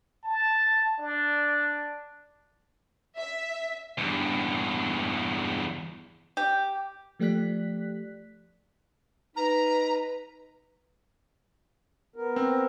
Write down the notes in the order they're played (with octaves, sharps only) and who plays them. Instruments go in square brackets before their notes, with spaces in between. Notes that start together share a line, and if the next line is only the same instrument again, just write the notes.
[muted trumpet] A5
D4
[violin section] E5
[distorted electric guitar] E2 G2
[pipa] G4
[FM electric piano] F3 A3 G4 D5 F#6 B6
[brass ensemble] D#4 [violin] B4 [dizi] A#5
[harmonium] B3 A#4
[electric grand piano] C4